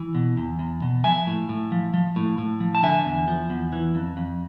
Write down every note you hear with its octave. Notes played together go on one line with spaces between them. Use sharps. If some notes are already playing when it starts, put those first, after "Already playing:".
Already playing: E3
B2
E2
E2
B2
F3 E5 G#5
A2
A2
F3
F3
A2
A2
F3
A5
D3 E5 G#5
E2
F3
E2
E3
F2
F2